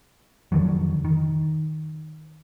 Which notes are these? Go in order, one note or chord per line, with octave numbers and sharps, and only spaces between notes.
F2 D3 D#3 F#3
D#3